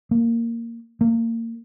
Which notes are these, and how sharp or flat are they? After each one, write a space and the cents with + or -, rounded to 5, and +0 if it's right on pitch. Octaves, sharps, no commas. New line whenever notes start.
A#3 -10
A#3 -30